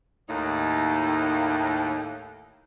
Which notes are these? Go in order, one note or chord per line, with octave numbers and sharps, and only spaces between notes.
D#2 A2 D#4